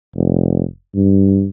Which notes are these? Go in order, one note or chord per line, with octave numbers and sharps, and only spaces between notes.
F1
G2